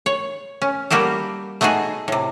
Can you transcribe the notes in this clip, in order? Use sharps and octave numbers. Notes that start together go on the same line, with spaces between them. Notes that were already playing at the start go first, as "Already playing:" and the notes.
C#5
C#4
G3 A#3 F#4 G4 A4
A3 B3 D#4 F#4 G#4
A2 C3